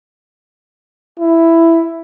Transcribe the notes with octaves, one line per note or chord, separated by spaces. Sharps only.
E4